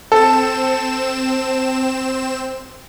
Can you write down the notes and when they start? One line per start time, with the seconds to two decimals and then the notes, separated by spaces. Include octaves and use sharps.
0.12 C4 A4 E7